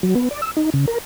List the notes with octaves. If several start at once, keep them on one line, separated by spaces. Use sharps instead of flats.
F#3
B3
D5
E6
D#4
C#3
A#4